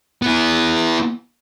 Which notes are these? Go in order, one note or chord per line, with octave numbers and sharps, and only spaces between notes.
B3 E4